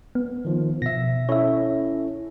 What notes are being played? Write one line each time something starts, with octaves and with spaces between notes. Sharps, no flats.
B3
D#3 F3
B2 E5 A#6
C#4 E4 A4 C#5 E5